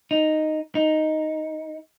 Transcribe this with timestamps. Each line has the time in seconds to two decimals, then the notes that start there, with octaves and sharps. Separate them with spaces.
0.11 D#4
0.75 D#4